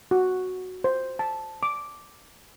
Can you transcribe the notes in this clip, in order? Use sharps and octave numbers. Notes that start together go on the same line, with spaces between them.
F#4
C5
A5
D6